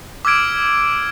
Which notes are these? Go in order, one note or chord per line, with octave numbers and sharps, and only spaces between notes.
D6 E6 F6 G#6 D7